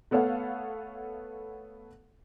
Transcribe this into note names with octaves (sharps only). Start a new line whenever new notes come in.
A3 B3 A4 C#5 F5 F#5